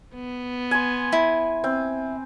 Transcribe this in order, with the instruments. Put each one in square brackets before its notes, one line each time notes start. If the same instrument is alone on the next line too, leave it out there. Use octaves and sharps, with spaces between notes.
[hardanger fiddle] B3
[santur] G#5 C6
[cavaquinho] E4
[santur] C4